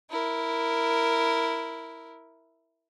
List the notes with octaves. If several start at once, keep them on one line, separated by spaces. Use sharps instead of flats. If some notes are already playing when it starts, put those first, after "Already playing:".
E4 A#4